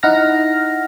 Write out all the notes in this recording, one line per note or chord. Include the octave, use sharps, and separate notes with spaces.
D#4 E4 F#5 F6 A#6